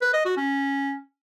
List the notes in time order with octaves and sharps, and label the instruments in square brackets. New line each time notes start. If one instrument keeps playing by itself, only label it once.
[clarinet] B4
D#5
F#4
C#4